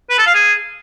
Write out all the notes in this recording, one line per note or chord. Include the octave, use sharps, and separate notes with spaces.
B4
A4
F5
G#4